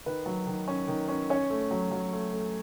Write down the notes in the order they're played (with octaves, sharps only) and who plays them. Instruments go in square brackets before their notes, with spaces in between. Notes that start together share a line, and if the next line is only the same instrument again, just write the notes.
[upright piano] D#3 B4
F#3
D#3
C#4
D#3
C#4
C#4 C#5
A3
F#3
F#3
A3
A3